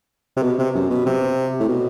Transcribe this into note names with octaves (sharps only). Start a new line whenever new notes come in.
C3
B2
C3
F#2
B2
C3
A2
B2